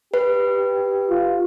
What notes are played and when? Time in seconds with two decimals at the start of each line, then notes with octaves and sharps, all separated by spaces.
0.14 G4 B4
1.10 F4